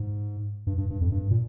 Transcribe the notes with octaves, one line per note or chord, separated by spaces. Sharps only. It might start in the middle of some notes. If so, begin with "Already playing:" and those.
Already playing: G#2
G2
G2
G2
F2
G2
A#2